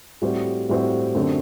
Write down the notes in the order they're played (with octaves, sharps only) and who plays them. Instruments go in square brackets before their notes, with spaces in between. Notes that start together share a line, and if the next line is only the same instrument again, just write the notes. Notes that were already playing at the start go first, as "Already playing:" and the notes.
[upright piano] A2 G3 C4 F#4 C5
A2 G3 C4 F#4 C5
F#2 D3 A3 C4 F#4